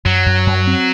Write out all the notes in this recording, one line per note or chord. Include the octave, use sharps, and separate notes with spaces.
F#2 F#3
F#2
F#2
C4